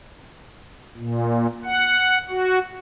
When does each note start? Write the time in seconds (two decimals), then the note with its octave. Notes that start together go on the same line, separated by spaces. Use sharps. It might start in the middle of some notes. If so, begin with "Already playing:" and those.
0.97 A#2
1.65 F#5
2.30 F#4